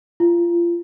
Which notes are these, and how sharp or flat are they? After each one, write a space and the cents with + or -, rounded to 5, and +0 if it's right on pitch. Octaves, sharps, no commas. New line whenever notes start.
F4 -25